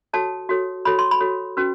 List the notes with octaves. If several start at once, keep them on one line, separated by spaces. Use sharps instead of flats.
F#4 A4 C#5 A5
F#4 A4 C#5
F#4 A4 C#5 B5
C6
B5
F#4 A4 C#5
C#4 F#4 B4